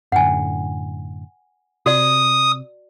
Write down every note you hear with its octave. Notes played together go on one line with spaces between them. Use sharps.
F#2 A2 D3 F#5 G#5
C3 F#4 D5 D#6